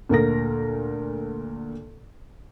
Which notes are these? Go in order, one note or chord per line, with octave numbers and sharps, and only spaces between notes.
D2 A#2 A#4 A#6